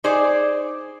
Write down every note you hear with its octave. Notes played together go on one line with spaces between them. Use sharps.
D#4 G#4 C5 D5